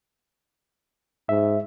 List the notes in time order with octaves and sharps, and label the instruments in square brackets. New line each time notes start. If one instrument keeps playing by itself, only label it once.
[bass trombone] G#2 [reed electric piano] E5